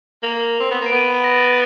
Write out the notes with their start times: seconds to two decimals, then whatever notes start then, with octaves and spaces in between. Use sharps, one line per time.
0.23 A#3 F7
0.60 C4
0.71 B3
0.81 A#3 D7
0.92 B3 D#7
1.24 A#6
1.33 A6